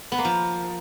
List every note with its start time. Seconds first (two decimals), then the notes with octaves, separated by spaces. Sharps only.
0.12 B3
0.18 A#3
0.25 F3